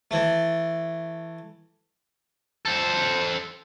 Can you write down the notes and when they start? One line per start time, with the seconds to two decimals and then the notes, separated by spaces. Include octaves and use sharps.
0.11 E3 A3
2.65 A4 C5